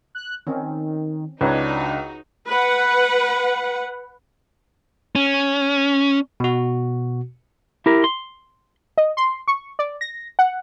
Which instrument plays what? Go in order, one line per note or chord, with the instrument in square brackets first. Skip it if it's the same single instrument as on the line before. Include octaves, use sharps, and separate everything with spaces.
[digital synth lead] F#6
[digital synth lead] D#3 [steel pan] C4 C#4
[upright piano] C#2 [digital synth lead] D4 [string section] D#4 F#4 [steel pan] B4 C#5 A#5
[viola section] B4 F#5
[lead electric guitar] C#4
[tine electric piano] B2 F#4
[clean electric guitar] E4 G4 A#4
C6
[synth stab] D#5
C6
C#6
D5
A#6
F#5